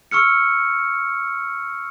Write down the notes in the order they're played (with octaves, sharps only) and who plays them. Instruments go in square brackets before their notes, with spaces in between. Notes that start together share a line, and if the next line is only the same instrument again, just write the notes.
[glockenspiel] C#6 E6 F6 C#7